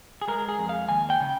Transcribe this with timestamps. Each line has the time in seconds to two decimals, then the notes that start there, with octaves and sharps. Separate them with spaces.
0.22 G#4
0.28 G#3 A#4
0.49 G#4
0.59 F2
0.69 F5
0.89 D#2 G#5
1.10 G5
1.20 C#3